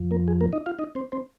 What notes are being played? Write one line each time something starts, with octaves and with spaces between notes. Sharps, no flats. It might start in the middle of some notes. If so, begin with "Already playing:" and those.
Already playing: F2 F3
A#3 A#4
G#4
A#3 A#4
D#4 D#5
F4 F5
D#4 D#5
C4 C5
C4 C5